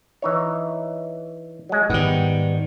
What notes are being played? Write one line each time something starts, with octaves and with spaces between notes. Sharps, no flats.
E3 D#4 C#5
F#3 G#3
G#2 D#3 G3 B3